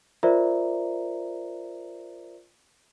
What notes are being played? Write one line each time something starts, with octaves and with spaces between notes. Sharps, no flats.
F4 A#4 C5 D5 E5 A#5